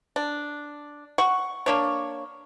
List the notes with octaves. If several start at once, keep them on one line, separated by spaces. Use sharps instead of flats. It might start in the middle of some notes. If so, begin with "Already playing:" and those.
D4
F#5 C#6
A#3 D4 C#5